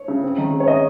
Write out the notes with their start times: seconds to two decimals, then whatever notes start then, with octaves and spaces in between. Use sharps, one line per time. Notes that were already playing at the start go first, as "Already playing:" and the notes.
Already playing: C#5
0.08 C#3
0.23 C4
0.38 D#3
0.53 G#3
0.60 C#5
0.68 D#5